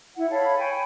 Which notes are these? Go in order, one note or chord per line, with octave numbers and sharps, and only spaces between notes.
E4 F#5
A4 C#5 F5 B5
C#5 G5 G#5 B5